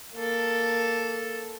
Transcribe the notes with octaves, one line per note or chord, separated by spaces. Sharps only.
A#3 A4